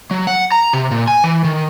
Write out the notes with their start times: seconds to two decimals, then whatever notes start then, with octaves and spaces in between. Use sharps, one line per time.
0.11 F#3
0.27 F#5
0.52 A#5
0.73 C3
0.91 A#2
1.08 G#5
1.24 E3
1.44 D#3